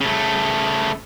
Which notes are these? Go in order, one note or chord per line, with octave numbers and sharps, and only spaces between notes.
C#3 A3